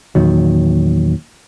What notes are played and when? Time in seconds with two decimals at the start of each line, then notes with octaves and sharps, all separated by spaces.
0.15 E2 A#2 D#3 F#3